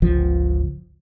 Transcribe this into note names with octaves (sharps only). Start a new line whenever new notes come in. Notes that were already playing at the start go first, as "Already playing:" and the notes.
G1 C#2 F3